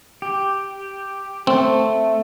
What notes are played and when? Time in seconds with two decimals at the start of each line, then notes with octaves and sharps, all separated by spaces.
0.22 G4
1.47 A3 C4